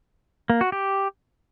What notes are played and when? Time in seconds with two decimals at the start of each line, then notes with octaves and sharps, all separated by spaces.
0.50 A#3
0.61 F#4
0.72 G4